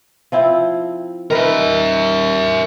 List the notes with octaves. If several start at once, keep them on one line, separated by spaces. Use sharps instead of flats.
F3 C4 E4
D#3 A#4 B4 E5